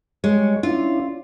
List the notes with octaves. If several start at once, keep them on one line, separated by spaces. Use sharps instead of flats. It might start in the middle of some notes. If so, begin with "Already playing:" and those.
G3 G#3 C#5
C#4 D4 E4 F4